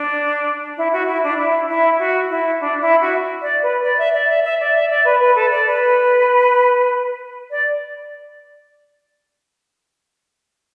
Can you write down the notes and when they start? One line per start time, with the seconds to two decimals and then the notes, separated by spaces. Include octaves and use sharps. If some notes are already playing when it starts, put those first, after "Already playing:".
Already playing: D4
0.77 E4
0.92 F#4
1.07 E4
1.23 D4
1.38 E4
1.68 E4
1.98 F#4
2.30 E4
2.60 D4
2.81 E4
3.01 F#4
3.41 D5
3.62 B4
3.82 D5
3.98 E5
4.13 D5
4.29 E5
4.44 E5
4.60 D5
4.74 E5
4.89 D5
5.05 B4
5.20 B4
5.35 A4
5.51 D5
5.66 B4
7.50 D5